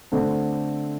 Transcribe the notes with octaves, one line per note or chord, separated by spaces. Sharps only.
D3 A3 C4